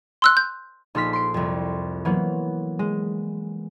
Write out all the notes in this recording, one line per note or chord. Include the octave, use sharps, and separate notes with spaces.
C6 E6 F#6
G6
A#1 D#4 A4 C6 F6 B6
C6 D7
C2 F2
E3 F#3 A#3 B3
G#3